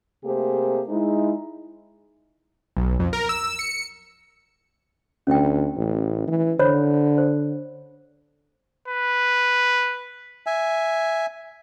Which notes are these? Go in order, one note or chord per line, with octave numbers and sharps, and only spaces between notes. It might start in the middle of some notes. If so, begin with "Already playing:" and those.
C3 A3 A#3 G4 G#4 C5
G#3 D#4 E4
B1
F2
A#4
E6
C#7
D2 C#4 G5
A1
E3
D3 C5 C#5 B5
C5
B4
E5 G#5